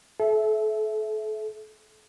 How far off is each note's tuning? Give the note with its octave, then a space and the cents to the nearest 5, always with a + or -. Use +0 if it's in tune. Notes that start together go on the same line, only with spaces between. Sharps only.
A4 -35 E5 +0